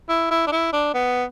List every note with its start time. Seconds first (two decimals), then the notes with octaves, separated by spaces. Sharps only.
0.09 E4
0.31 E4
0.47 D4
0.52 E4
0.73 D4
0.94 B3